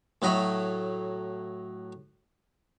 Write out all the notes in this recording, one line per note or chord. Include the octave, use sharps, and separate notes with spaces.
A2 F#3 D#5 B5